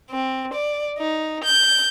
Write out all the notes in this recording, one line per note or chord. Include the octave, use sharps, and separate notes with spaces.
C4
D5
D#4
G6